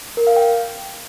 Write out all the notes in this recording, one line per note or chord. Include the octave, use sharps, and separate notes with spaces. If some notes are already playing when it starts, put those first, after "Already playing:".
A#4
F5
G5